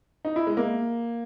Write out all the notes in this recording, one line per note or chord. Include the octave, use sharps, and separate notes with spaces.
D#4
E4
G#3
A#3